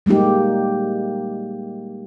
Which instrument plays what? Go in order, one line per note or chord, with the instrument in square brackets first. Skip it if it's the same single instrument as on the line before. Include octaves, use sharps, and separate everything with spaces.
[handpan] G3 G#3 A#3 D#4 G4